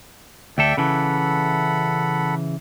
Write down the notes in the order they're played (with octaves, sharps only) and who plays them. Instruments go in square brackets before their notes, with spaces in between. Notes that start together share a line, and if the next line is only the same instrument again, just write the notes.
[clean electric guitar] D2 A4 [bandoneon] D5 E5 G5
[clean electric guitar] C#3 E3 [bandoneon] A4 F#5 B5